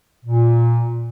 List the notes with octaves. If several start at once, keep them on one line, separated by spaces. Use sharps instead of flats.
A#2